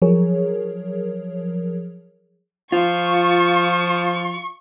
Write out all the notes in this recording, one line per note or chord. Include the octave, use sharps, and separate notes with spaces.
F3 F#3 G#4 A#4 C#5
F3 F4 C#6